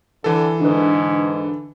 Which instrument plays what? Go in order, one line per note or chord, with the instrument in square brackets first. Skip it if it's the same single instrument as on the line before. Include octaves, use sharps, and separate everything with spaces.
[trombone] D3 [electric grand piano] E3 A4
[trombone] G#2 [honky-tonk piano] D3 B4